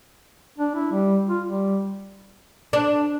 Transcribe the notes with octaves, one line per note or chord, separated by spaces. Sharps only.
D4
E4
G3
F4
G3
D4